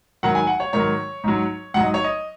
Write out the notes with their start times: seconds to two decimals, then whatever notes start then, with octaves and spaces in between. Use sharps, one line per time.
0.23 G#2 D#3 F#3 F#5
0.35 G#5
0.47 F#5
0.60 C#5
0.73 G#2 D#3 F#3 C#5
1.24 G#2 F#3
1.74 G#2 F#3 F#5
1.83 D#5
1.94 C#5
2.04 D#5